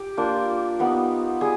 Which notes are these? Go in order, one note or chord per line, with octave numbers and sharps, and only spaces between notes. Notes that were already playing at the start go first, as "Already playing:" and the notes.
Already playing: G4
A#3 D4 F4
G3 B3 D#4
G3 G#4